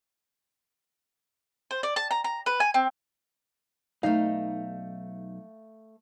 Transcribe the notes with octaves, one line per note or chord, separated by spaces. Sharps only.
C5
D5
A5
A#5
A#5
B4
G#5
C4
B1 A3 D#4 F5